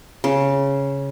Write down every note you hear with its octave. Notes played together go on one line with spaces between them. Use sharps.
C#3